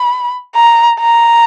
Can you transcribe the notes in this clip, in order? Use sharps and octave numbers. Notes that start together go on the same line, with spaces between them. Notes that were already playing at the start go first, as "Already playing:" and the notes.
Already playing: B5
A#5
A#5